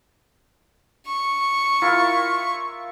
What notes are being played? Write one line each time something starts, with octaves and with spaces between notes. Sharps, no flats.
C#6
E4 F4 A#4